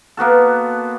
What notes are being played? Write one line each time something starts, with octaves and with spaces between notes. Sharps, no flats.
A#3 B3 F#4 A4